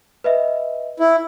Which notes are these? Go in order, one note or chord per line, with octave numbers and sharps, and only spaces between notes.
B4 D#5 E5
E4